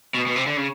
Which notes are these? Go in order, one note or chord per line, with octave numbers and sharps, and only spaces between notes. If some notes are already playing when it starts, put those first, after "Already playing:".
B2
B2
C3
D3
C#3